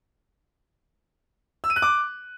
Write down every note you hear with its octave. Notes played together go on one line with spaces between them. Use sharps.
E6
D#7
F#6
D6